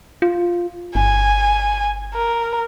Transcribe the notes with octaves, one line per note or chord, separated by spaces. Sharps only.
F4
G1 G#5
A#4